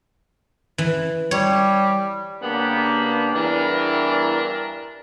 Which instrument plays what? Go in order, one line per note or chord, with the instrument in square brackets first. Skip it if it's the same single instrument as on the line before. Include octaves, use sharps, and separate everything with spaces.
[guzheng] E3
[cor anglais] G3 [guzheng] C#5
[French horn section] C#3 A#3 D4 [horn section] B3 G4
[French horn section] E2 E3 [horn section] G2 D4 A#4